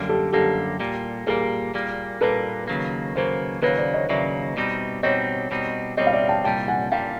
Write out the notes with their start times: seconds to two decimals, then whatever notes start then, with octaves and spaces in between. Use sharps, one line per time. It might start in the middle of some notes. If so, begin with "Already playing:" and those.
Already playing: F#2 D3 G3 A#3
0.09 G4 A4
0.33 F#2 D3 G3 A#3 G4 A4
0.80 A#2 G3 A#3
1.27 A#2 G3 A#3 G#4 A#4
1.74 A#2 G3 A#3
2.21 A#2 G3 A#3 A4 B4
2.68 D#2 C#3 F#3 A#3
3.15 D#2 C#3 F#3 A#3 A#4 C5
3.62 D#2 C#3 F#3 A#3 B4 C#5
3.78 C5 D5
3.94 C#5 D#5
4.09 D#2 C#3 F#3 A#3 D5 E5
4.57 B2 G3 C4 D#4
5.03 B2 G3 C4 D#4 C#5 D#5
5.51 B2 G3 C4 D#4
5.97 B2 G3 C4 D#4 C#5 D#5
6.07 F5
6.13 D5 E5
6.29 G5 A5
6.44 C2 A#2 G3 G5 A5
6.68 F#5 G#5
6.92 A#2 G3 F5 G5